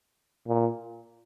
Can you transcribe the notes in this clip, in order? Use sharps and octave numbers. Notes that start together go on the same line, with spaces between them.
A#2